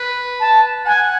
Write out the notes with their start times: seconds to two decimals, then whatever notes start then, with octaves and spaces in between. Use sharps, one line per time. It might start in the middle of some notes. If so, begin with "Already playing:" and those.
Already playing: B4
0.40 A5
0.86 F#5 G#5